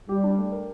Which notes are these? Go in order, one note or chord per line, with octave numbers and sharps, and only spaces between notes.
G3 G4
D4
A3
A#4